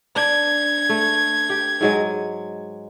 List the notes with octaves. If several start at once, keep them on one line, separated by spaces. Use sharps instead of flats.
D4 G#6
A3
G4
G#2 F#3 G#3